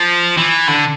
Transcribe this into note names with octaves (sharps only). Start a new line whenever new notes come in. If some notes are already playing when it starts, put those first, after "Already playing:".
Already playing: F3
E3
D3